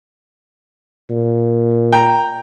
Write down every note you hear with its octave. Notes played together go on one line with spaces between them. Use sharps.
A#2
G5 A#5